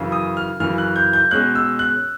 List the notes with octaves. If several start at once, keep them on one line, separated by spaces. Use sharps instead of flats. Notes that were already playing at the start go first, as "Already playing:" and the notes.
Already playing: F#2 C#3 E3
D#6
F6
F#2 C#3 E3 F6
F#6
G6
G6
B2 G#3 C#4 F#6
E6
F#6